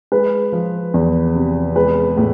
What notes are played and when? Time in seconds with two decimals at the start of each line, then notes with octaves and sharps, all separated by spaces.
0.12 G#3 B4
0.52 F3
0.94 E2
1.35 C3
1.76 G#3 B4
2.17 A2